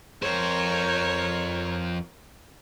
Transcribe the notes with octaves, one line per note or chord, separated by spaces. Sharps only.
F2 A#4 C5 C#5